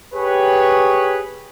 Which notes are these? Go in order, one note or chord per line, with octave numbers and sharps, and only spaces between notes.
G4 G#4 B4 C#5